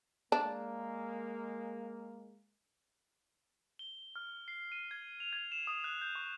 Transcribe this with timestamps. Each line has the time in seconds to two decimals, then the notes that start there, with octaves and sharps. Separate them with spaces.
0.32 G#3 A#3 D4
3.79 G7
4.16 F6
4.48 C7
4.72 D#7
4.91 G#6
5.20 F7
5.33 G#6
5.52 E7
5.67 D#6
5.84 F#6
6.01 G6
6.15 C#6